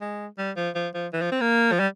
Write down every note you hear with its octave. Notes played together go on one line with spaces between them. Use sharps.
G#3
G3
F3
F3
F3
E3
F3
C4
A#3
F3
G3